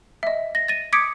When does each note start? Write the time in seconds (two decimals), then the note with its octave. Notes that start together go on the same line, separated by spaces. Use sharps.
0.23 D#5 E5
0.55 A#6
0.68 A6 A#6 D#7
0.93 D6 D#6 G#6 B6 C#7 D7